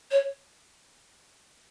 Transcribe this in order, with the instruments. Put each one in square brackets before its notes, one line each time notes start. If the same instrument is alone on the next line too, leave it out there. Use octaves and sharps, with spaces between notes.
[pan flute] C#5